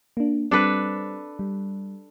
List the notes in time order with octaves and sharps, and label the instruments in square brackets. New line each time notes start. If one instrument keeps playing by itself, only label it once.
[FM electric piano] A#3 D4
[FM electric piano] G3 C4 [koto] D4 A4 B4
[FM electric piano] G3